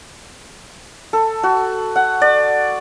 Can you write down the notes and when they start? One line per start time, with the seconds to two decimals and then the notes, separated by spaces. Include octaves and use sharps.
1.13 A4
1.43 F#4
1.96 F#5
2.21 D5